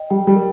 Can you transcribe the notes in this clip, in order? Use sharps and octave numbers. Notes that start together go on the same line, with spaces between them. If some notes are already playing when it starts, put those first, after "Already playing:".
Already playing: D#5 G5
G3 G5
G3
A#4